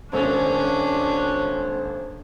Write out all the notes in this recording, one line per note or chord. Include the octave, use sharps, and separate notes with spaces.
D#1 G#1 C#4 D4 A4 C5